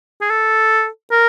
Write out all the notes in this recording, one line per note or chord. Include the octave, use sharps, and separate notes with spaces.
G#4
A4
A#4